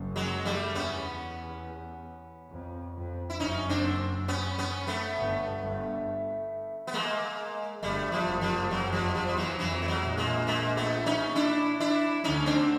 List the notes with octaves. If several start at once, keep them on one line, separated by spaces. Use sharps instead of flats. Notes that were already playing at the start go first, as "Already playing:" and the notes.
Already playing: F#1 F#2
F#3 G#3
G3 A3
E2 B3 C#4
F2
F2
E4
F#1 F#2 C#4 D#4
C4 D4
B3 C#4
B3 C#4
A3 B3
G1 G2
G1 G2
B3
G#3 A#3
G1 G2 G3 A3
F3 G3
F#1 F#2
F3 G3
F#1 F#2 F#3 G#3
F3 G3
F2
G#3
F3 G3
E2 G3
E3 F#3
F2 E3 F#3
A3
F#3 G#3
A#1 A#2
G#3 A#3
G#3 A#3
A3 B3
C#4 D#4
D4 E4
D4 E4
D2 D3 C#4 D#4
C4 D4